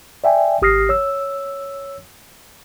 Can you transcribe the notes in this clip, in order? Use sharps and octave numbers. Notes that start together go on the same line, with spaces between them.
D5 E5 G5 G#5
G#1 G4 D#6 F6 A#6 C7
C#5 E6